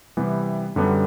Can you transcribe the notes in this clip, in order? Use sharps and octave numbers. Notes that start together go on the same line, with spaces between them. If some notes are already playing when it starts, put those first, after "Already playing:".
C3 E3 G3 B3
F#2 D3 G3 B3 D4